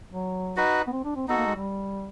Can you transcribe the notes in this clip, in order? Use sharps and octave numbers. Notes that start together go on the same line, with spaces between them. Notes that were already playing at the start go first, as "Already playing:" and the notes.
F#3
D#4 F#4 B4
B3
C4
D4
C4
B3 D#4 F#4 A4
A#3
G#3
G3